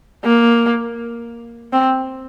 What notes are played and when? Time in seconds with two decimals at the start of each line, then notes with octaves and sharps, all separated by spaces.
0.24 A#3
1.73 C4